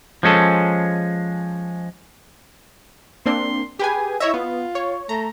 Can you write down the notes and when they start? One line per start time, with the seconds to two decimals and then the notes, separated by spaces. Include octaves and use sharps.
0.23 F3 G#3 C#4 A4
3.26 A#3 C4 D4 C6
3.79 G4 G#4 B4 G#5
4.20 E4 C#5 D#5 E5
4.34 B3 F4
4.75 C#5
5.09 A3 A#5